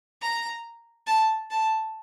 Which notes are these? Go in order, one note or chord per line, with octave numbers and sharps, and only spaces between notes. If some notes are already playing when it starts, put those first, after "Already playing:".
A#5
A5
A5